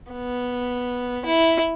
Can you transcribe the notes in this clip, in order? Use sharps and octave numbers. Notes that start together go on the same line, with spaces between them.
B3
E4